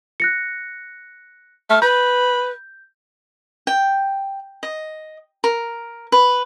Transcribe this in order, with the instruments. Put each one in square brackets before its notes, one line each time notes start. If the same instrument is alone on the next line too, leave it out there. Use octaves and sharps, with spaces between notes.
[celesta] F#6 A#6 C#7
[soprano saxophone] A3 [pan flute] F6
[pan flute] B4 [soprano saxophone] B5 [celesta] G6
[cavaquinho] G5
D#5
A#4
B4